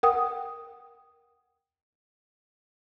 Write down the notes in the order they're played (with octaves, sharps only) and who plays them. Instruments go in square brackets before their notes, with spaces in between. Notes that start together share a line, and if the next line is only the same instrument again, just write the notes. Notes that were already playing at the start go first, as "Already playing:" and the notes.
[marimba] A#4 F#5 G5 D#6